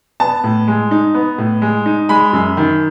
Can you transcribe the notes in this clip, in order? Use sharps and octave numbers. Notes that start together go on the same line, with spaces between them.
B3 A5
A2
G#3
D#4
B3
A2
G#3
D#4
G#3 B5
F#2
D#3